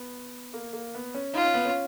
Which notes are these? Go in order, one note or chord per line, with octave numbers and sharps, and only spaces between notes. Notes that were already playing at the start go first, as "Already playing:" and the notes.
Already playing: B3
A#3
A#3
B3
C#4
D#4 F4
C#4
B3
C#4